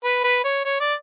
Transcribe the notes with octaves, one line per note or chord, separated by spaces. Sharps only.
B4
B4
C#5
C#5
D5